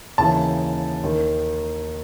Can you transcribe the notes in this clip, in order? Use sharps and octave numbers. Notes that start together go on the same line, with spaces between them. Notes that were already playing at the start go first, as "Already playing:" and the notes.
D#2 C#3 E3 A5
D#2 D#3